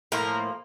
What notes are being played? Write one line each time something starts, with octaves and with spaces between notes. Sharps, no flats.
A2 F3 A#3 A#4